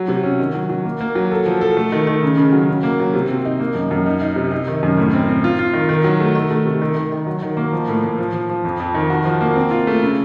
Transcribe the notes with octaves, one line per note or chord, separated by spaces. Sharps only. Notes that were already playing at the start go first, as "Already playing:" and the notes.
Already playing: F#3
C3
C#4
D#3
F#3
F#3
A#3
A#3
F#3
A4
F3
A4
A3
D#3
D#3
C#3
C#3
F#3
C#3
A#3
F#3
C3
C4
D#4
A#3
F#2
F#2
D#4
D#4
C3
D#4
D#3
F#2
A2
C4
C4
F4
F4
D#3
D#3
F#3
A3
D#3
A3
C3
D#3
D#3
D#3
F#3
D#3
A#3
F3
A2
A2
F3
F3
F3
F2
F2
D#3
F#4
F3
A#3
C4
F4
A3
C#3